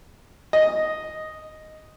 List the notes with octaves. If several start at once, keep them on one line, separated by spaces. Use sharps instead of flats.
D#5